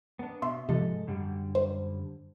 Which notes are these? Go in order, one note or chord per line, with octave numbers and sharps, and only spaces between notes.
B3 D4
B2 E5 C6
G#2 C3 F3 A4 D#5
F#2 D3 G3
C5